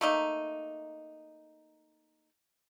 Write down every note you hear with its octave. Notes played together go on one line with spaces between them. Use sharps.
A3 A#3 D#4